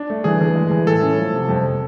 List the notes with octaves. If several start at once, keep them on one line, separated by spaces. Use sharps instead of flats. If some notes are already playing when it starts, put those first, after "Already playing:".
Already playing: D4
A3
E3 G#4
E3
G#3
E3
A2 A4
C#4
F3
C3
F2